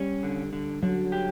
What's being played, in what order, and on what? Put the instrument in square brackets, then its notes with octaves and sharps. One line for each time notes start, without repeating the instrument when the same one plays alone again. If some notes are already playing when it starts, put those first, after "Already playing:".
Already playing: [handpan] G3 [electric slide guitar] C#4
[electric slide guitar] D3
D3
[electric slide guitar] D3 [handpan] F#3
[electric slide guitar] G4